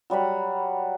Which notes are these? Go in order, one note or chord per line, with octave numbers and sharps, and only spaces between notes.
F#3 G3 F#5 B5